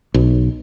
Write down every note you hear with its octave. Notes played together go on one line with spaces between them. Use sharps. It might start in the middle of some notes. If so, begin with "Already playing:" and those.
B1